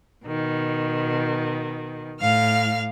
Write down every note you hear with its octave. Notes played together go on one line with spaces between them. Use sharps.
B2 D#3
A2 F5 F6